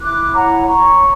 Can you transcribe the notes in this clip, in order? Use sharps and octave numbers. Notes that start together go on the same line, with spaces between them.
E4 D6 F#6
C#5 F#5 A#5
C#5 A#5 C#6